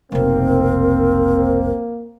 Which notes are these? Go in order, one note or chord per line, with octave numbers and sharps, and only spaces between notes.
F1 B1 A#3 C4 A#4